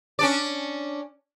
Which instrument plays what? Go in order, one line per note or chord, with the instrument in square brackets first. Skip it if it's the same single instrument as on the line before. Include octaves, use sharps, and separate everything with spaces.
[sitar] C#4 D4 D5